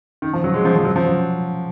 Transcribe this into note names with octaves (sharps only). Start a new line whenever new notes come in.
D#3
F3
F#3
G#3
F3
F3
F#3
F3
F#3